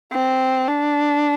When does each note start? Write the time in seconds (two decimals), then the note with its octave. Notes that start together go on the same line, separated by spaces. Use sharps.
0.13 C4
0.68 D4